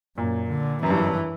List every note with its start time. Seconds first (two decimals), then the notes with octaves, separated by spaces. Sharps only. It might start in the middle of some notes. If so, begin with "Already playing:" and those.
0.17 F#2 A#2
0.50 D3
0.83 F#2 E3
0.90 G2
0.99 F#2
1.07 G2